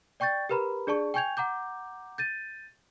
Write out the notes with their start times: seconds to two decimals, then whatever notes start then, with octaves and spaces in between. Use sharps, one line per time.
0.20 D5 G5 C#6 G6 A6
0.49 G4 A#4 B4 A#5 B5
0.87 D4 G#4 D5 A5 C#6
1.14 G5 G#5 C#6 G6 G#6 F7
1.37 F#5 A#5 D6 G6
2.18 G6 A6 D#7